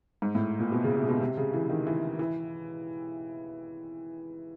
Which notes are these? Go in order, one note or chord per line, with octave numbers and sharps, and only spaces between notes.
G#2
A2
A#2
B2
C#3
C3
B2
C3
C#3
E3
D#3
E3
E3